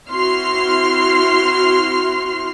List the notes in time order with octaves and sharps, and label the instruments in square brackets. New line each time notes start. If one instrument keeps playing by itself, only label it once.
[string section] C4 E4 F#4 C6 F6 C7